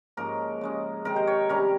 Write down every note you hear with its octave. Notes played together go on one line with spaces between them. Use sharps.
G#2 F3 A#3 C#4 A#4
C#3 G#3 C#4
C3 D#3 G#3 A#4
C5
C#5
C3 D#3 G3 C#4 A#4